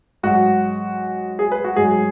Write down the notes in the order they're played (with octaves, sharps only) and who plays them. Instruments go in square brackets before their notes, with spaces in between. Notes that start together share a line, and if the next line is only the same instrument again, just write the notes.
[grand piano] G#2 F#3 F#4
G#4
B4
F#4
G#2 F#3 G#4